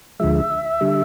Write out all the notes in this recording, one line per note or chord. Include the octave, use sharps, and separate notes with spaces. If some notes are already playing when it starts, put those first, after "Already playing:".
D2 D3 F3 G#3 E5
D3 G3